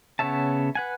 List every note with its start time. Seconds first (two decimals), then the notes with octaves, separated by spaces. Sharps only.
0.19 C#3 B3 C#5 E5 A5
0.75 B4 F#5 G#5